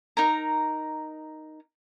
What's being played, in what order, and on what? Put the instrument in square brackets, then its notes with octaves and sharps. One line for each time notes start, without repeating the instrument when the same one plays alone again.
[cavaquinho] D#4 A#4 A#5